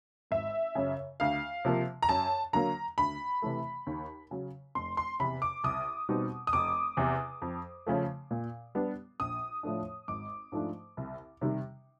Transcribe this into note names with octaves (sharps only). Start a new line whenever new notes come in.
G#1 E5
F#2 C#3
D2 F5
C3 F3 A#3
A#5
F#2 A5
D3 F#3 A#3 A#5
D2 B5
C3 E3 A3
D#2
C#3 F#3
F1 C6
C6
E2 C3 B5
D6
C2 D#6
B2 G3 C4 D#4
D#6
F1 D6
E2 C3
F2
C#3 F3 A3
A#2
G3 B3 D4
A#1 D#6
A2 F3 A3 D4
G#1 D6
G#2 F3 A3 D4
C2
C3 D#3 G3